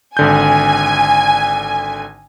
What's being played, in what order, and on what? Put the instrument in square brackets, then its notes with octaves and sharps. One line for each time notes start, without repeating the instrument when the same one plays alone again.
[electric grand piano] G#1 D3 G6 [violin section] G#5